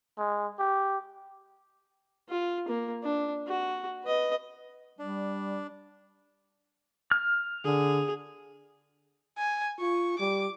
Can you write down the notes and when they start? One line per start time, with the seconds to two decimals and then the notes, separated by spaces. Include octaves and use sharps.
0.18 G#3
0.59 G4
2.29 F4
2.68 A#3
3.03 D4
3.47 F#4
4.04 B4 D#5
4.99 G3 D4
7.11 F6
7.64 D3 G#4
9.38 G#5
9.80 F4 C#6
10.19 G3 D6